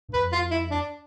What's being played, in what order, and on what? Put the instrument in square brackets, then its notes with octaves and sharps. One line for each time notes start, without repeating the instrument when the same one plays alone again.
[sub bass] G2
[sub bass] F2 [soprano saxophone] B4
[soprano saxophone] F4
E4
D4